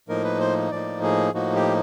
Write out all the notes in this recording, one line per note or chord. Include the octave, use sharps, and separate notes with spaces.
A2 F3 A#3 D#4 A#4
B4
C5
A2 F3 A#3 D#4 D5
G#4
A2 F3 A#3 D#4 F#4
G4